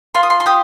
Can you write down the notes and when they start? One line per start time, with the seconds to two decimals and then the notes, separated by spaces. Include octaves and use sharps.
0.15 F4 C6
0.23 D#6
0.30 C6
0.40 C6
0.46 G4 D#6